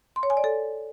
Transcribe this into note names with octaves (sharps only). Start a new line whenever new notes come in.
C6
C#5
G#5
D5
A4